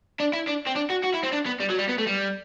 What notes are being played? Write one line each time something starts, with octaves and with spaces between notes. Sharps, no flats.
D4
E4
D4
C4
D4
F#4
F#4
E4
C4
D4
B3
G3
F#3
G3
B3
A3
G3